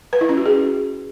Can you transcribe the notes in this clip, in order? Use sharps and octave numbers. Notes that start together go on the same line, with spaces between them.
B4
E4
C#4
F#4
G#4